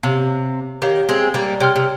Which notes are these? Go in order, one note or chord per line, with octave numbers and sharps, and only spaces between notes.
C3 G4 C#5 F5
D#3 G4 C#5 F5
G#3 C4
G3 A#3
C3 C#5 G5 C6 F6
C3